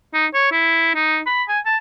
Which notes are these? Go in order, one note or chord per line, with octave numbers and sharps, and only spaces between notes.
D#4
C#5
E4
D#4
B5
G#5
A5